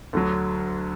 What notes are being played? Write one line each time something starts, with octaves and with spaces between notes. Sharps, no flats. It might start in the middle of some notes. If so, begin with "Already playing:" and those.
D2 D3 F#3